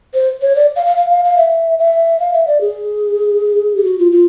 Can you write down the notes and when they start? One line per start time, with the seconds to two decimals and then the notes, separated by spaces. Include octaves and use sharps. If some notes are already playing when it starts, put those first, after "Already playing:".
0.14 C5
0.42 C#5
0.55 D5
0.76 F5
0.86 F5
0.97 F5
1.10 F5
1.25 F5
1.37 E5
1.79 E5
2.20 F5
2.33 E5
2.47 D5
2.61 G#4
3.76 G4
3.84 F#4
3.99 F4
4.12 F4